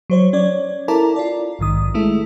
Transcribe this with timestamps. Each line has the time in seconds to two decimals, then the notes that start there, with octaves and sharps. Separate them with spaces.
0.10 F#3 C5 C#5
0.33 C#4 C#5 D5
0.88 E4 A4 A#4 A5 A#5 D6
1.16 F4 D5
1.59 A#1 G#2 D#3 D#6
1.94 G#3 A3 E4 A4